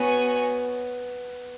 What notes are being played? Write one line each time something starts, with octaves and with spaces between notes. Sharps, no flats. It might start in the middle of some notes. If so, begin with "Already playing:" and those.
Already playing: B3 F#4 C#5 G#5